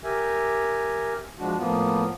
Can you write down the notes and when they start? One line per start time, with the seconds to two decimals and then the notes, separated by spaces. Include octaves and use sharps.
0.04 G4 A#4 E5 G#5
1.39 F3 G#3 D4 F#4
1.58 A2 F3 A#3 B3 F4